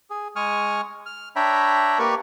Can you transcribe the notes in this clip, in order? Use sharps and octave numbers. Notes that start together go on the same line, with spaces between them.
G#4
G#3 G#5 C#6 D#6 F6
F6
D4 C#5 E5 G5 A#5 B5
A#3 G4 A#4 B4 D5 C#6